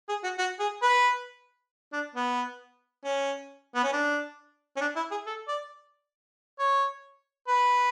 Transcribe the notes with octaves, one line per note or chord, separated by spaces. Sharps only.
G#4
F#4
F#4
G#4
B4
D4
B3
C#4
B3
C#4
D4
C#4
D4
E4
G#4
A4
D5
C#5
B4